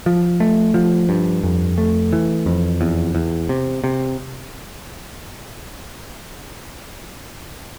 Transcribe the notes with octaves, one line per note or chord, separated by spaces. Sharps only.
F3
A3
F3
G2
F2
A3
E3
F2
E2
E2
C3
C3